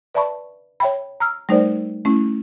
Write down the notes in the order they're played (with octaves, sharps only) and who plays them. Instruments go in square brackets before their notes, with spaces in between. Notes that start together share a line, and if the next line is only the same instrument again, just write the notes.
[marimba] B4 D5 E5 A5 B5 C#6
C#5 E5 G5 B5
A#5 E6 F6
G3 A3 D#4 A#4 C5 D5
A3 C#4 E4